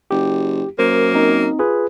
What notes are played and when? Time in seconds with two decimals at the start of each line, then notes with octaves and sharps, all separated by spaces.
0.11 F#1 G4
0.79 F#2 A#3 C5
1.14 C4 D#4
1.59 F4 G#4 B4